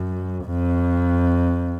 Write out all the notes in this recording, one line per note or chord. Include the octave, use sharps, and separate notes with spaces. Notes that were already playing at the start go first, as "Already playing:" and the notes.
Already playing: F#2
F2